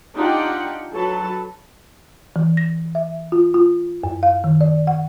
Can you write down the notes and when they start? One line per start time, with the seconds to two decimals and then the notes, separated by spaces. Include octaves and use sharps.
0.15 D4 D#4 F4 G4 F#5 G5
0.93 F#3 A4 B4 A5
2.36 E3
2.57 A#6
2.95 E5
3.32 F4
3.54 F4
4.04 F#2
4.23 F5
4.44 D#3
4.61 D5
4.87 F#5